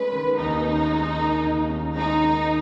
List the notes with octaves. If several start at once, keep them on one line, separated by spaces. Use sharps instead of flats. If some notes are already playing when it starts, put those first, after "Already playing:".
Already playing: G#3 C#4 B4
D#3
D#2 D#4
C#4
G#3
D#3
D#2
C#4
G#3 D#4
D#3